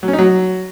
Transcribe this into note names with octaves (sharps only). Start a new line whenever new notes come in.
F#3
C#4
D#4
F#3